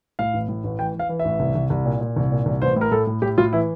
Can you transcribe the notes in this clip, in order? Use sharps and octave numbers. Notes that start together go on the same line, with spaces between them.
A2 F5
A1
A2
A1
E3 G5
E3 F5
E3
E5
A1
C2
C2
C2
A#2
A#2
C2
A#2
C2
A1 C5
A2
A#4
A2 A4
A2
A2 G4
A2 F4
E3 E4